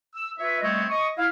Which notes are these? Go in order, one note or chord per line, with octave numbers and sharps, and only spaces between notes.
E6
F4 B4 C#5 E5
G3 A3 B3 C4 C#5 D#5
D#5 C#6 D#6
E4 F5